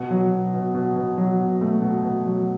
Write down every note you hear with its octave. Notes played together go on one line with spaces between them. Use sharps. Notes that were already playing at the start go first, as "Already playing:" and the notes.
Already playing: B2
F#3
B2
B2
B2
B2
F#3
B2
A3
B2
B2
F#3